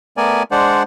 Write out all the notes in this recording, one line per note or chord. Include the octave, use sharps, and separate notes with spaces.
A3 B3 A#4 D5 G#5
G#3 D4 C5 D5 F#5